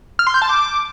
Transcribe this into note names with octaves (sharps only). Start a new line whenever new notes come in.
F6
C6
G6
A5
D6